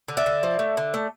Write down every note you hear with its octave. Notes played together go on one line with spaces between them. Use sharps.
D3
D5 E5
D3
F3
A3
D3
A3